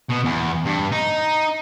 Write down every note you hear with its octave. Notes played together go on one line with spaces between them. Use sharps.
B2
E2
G2
D#4